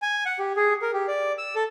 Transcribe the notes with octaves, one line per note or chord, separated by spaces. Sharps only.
G#5
F#5
G4
G#4
A#4
G4
D5
E6
A4